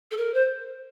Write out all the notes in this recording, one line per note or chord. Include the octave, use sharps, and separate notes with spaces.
A4
A#4
C5